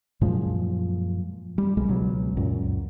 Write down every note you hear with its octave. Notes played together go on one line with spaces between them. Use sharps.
F#2 A#2 F3 G#3
G3
C2 B2 G3 G#3
C#2 B2 F#3
C#2 F#2 A#2